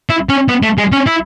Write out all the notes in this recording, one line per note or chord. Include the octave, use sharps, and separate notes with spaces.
E4
C#4
B3
A3
G#3
C#4
E4